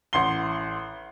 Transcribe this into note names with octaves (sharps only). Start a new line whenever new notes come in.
A1 F#5 C6 C7 G7